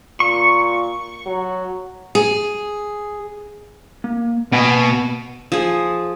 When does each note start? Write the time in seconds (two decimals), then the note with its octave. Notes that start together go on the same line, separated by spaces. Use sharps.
0.20 A#2 C#6
1.26 F#3
2.15 G#4
4.04 A#3
4.52 B2 A#3 G#5
5.52 F3 G#4